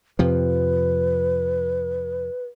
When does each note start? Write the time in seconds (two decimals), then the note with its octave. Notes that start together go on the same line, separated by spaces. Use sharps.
0.19 F2 C3 F3 B4